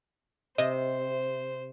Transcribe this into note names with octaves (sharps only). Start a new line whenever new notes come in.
C3 C5 D#5